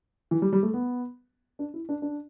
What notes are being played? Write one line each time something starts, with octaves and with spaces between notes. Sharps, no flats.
E3
G3
G3
A3
B3
D4
E4
D4
D4